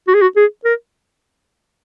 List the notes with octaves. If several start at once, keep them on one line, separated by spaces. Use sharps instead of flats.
F#4
G#4
F#4
G#4
A#4